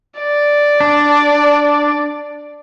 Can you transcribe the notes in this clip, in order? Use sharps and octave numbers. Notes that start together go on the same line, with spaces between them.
D5
D4